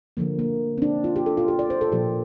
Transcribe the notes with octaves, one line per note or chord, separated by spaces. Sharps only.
D3 F3 A#3
A#3
C4
D4
F4
G4
A4
F4
G4
D5
C5
A4
A#2 F3 A#3 G4